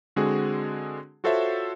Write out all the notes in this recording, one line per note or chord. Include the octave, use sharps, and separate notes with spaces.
D3 G#3 C4 F#4 G#4
F4 F#4 A4 C5 C#5 E5